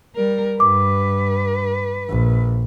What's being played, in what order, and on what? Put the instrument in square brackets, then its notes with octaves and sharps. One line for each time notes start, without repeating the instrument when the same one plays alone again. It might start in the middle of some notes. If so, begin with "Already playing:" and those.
[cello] G3 A#4
[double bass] G2 [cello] B4 [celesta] D6
[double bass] A#1